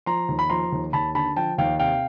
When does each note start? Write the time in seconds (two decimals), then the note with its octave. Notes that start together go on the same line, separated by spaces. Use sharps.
0.06 F3 A#5 C6
0.28 D#2
0.39 B5
0.50 F3 A#5 C6
0.72 D#2
0.93 D#2 A5 B5
1.15 D3 A5 B5
1.36 F3 G5 A5
1.58 D#2 F5 G5
1.79 C3 F5 G5